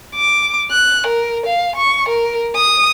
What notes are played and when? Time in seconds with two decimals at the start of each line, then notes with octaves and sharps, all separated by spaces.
0.16 D6
0.72 F#6
1.07 A#4
1.46 F5
1.76 C#6
2.09 A#4
2.56 D#6